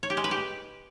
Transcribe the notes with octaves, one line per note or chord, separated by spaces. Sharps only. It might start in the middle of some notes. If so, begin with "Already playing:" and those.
C#5
G4
G#3
B4
G4